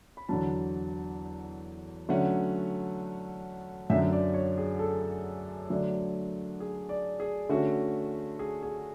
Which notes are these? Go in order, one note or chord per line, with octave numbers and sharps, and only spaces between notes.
B5
E2 D3 F#3 A5
D3 F#3 A3 C#4 F#5
F#2 D3 F#3 E5
D5
C#5
G#4
A4
D3 F#3 A3 D4
G#4
D5
G#4
D3 A3 C#4 F#4
G#4
G#4